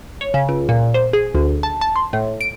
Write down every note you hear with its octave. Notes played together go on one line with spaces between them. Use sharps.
C#5
C#3
C#2
A#2
C5
G#4
D2
A5
A5
C6
A2
D7